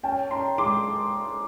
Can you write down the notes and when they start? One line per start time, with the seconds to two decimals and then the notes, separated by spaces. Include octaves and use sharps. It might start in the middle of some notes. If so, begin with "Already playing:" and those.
0.03 C#4 G5 A5
0.31 C#4 A#5 C6
0.58 G#3 C6 D6